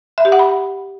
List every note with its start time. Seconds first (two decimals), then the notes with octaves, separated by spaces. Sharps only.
0.18 E5
0.25 G4
0.32 F#5
0.39 B5